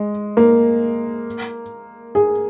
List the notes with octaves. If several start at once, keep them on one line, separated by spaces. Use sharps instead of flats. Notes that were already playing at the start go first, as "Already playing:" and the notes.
Already playing: G#3
A#3
G#4